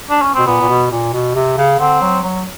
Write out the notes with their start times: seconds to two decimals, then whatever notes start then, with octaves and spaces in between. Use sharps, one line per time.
0.10 D4
0.22 C#4
0.35 B2 C4
0.47 A#2 B3
0.61 A#2
0.69 B2
0.91 A#2
1.13 B2
1.35 C3
1.58 C#3
1.79 D3 C4
2.01 F#3
2.23 F#3